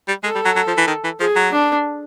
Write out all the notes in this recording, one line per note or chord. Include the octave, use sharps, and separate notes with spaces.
G3
G#3 A4
G3
F#3
F#3
F3
E3
D#3
E3
F3 G#4
F#3
D4